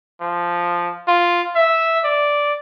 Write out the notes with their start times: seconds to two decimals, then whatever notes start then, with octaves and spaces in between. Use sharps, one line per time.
0.21 F3
1.08 F4
1.56 E5
2.04 D5